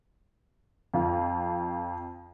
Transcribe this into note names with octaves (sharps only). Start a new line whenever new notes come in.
F2 F4